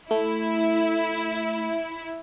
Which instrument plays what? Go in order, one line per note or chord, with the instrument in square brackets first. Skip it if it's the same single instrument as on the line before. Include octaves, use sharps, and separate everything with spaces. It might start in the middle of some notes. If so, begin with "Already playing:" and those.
[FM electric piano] A3 [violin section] E4